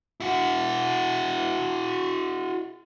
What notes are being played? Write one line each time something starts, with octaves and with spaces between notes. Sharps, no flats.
E4 F#4